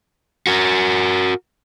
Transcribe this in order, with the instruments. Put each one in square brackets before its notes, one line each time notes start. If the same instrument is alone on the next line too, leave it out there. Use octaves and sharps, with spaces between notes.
[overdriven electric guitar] F#4 A#4